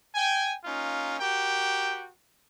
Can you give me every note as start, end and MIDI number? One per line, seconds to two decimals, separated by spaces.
0.15 0.54 79
0.15 0.54 80
0.64 1.18 58
0.64 1.18 61
0.64 1.18 63
0.64 1.18 65
1.20 2.08 66
1.20 2.08 67
1.20 2.08 70
1.20 2.08 79